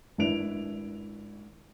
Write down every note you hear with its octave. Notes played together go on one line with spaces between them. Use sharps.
G#1 D4 E4 B4 D7 F7